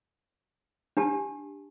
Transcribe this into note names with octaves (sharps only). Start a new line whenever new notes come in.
D4 G4 A5